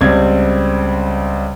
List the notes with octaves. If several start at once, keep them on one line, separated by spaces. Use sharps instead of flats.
C#2 G3 C4 G#6